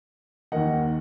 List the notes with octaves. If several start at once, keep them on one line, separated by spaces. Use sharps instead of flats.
D#2 D#3 A#3 D#5 F#5